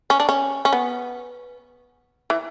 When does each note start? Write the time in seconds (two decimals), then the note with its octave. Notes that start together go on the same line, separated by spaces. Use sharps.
0.10 C#4
0.20 D4
0.29 C#4
0.65 C#4
0.73 B3
2.30 E3